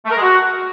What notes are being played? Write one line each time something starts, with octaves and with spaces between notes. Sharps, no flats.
A3
A#4
G#3
F#4